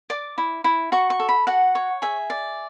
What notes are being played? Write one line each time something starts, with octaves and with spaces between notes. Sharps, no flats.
D5 D6
E4
E4
F#4 C#6
C#6
A4
B5
F#4 F#5
C#5
G#4 E5
D5